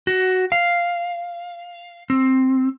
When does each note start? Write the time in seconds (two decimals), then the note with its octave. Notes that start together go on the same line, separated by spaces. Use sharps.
0.07 F#4
0.52 F5
2.10 C4